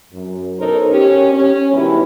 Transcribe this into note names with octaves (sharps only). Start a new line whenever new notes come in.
F#2
B2 D#4 A4 A#4 C5 C#5
C#4 G4 C#5
C#4
G#2 B2 D#3 G3 E4